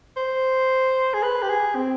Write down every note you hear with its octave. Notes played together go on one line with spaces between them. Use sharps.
C5
G#4
B4
G4
G#4
C4